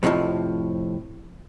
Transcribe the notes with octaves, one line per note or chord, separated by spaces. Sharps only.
F2 A2 C3 D#3 F3